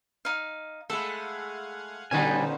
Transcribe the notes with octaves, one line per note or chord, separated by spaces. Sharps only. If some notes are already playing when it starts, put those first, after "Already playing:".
D#4 F5
G#3 A3 E4 A4 F5 F#5 G#5
A#2 D3 G3 C#4 D#4 B4 C5 G#5